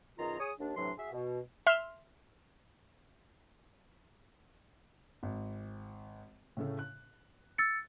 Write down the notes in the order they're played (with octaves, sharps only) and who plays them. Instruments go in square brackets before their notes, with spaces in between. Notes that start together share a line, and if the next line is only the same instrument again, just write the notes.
[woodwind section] F#2 B2 D#3 F4 G#4 A#5
G#4 C#5 D#6
D#2 D4
A2 C3 E3 F#3 D4 C6
F#4 G#4 E5
B2
[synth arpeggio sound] E5 C6 F6
[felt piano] G#1
A2 C#3 A3
F#6
[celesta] E6 A6 C#7